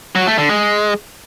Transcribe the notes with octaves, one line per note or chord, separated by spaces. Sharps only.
F#3
A3
D3
G#3